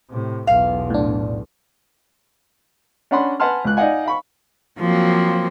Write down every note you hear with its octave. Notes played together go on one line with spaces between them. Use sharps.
A2 C3
B1 E2 F5
A2 D4
C#4 D4 D5 F#5 B5 C6
B4 F#5 G#5 A5 C6 F6
C#2 F#6
D#4 D5 D#5 F5 F#5 G#5
F5 B5 C#6
F3 F#3 A#3 C4